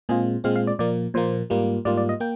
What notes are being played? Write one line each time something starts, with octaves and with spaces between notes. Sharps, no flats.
A#2 G#3 C4 F4 G#4
A#2 G#3 C4 F4 F5
F5
D5
A#2 F3 A#3 D5
A#2 F3 A#3 C5
G#2 G3 A#3 F4
G#2 G3 A#3 F4 D5
D5
D#5
A#3 G5